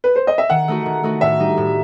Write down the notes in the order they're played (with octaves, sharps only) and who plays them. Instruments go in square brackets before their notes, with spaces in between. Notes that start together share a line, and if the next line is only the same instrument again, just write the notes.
[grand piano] B4
C5
D#5
E5
[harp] D#3 [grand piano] F#5
[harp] A3 D#4 F#4
D#3
A3 D#4 F#4
[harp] A2 [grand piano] E5
[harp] G3 D#4
A2